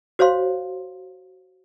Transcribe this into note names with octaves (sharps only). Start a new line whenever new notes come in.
F#4 C5 C#5 F5 C6